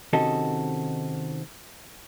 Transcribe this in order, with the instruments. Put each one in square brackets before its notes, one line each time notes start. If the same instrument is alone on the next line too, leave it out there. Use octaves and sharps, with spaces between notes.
[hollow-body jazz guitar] C3 D#3 C#4 F#4 A4 D#5